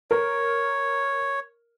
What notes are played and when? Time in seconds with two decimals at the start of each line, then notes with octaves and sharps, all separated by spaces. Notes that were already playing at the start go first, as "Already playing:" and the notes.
0.11 A#4 C#5